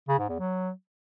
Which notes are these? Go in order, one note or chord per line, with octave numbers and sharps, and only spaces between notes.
C#3
G#2
E2
F#3